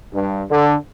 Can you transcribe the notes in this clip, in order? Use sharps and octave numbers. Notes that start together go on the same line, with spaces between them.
G2
D3